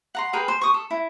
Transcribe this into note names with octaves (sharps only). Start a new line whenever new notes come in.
F#5 A#5 C6
G#4 A#4 B4 G5
C5
C#6 D#6
A4
E4